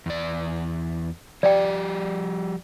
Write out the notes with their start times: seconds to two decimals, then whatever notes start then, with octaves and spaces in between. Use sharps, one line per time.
0.06 E2 D5
1.43 F3 G3 G4 D5 G5